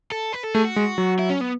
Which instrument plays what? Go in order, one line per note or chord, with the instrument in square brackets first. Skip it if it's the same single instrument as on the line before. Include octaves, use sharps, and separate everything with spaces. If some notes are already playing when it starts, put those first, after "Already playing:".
[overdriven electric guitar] A4
B4
A4
[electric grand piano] A3 [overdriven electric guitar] G#4
[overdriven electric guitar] F#4
[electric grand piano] G#3
F#3
[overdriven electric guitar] E4
C#4
B3